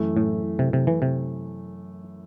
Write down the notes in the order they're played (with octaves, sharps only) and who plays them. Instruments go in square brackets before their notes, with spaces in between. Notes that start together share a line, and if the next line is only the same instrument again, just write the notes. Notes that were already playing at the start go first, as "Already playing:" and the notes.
Already playing: [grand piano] F#2 E3 A3
[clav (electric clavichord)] A2
C3
C3
E3
C3